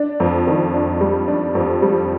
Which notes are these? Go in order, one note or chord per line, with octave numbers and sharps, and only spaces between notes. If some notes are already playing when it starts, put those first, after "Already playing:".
Already playing: D4
F2
D#3
D4
G3
D4
F2
G3